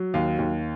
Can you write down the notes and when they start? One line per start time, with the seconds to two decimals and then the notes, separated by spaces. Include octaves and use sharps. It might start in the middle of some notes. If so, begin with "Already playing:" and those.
Already playing: F#3
0.14 D#2 F5
0.39 D#2